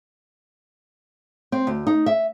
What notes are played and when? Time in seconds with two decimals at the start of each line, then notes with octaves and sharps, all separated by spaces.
1.52 C4
1.67 D2
1.87 D#4
2.06 E5